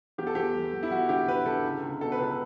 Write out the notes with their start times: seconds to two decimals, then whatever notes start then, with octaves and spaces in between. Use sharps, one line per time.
0.18 E2 G4
0.27 A4
0.35 E2 G4
0.55 E2
0.73 E2
0.83 E4
0.91 E2 F#4
1.09 D3 G4
1.27 D3 B4
1.46 D3 A4
1.65 C#2
1.82 C#2
2.00 B2 A4
2.12 B4
2.19 C#2 A4